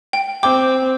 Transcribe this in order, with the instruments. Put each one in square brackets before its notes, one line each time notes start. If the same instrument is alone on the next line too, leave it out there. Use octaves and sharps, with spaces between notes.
[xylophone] G5
[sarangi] C4 [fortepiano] G5 [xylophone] D6